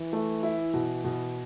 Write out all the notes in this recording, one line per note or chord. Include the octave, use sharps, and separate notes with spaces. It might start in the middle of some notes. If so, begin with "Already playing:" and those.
Already playing: E3
A3
E4
B2
B2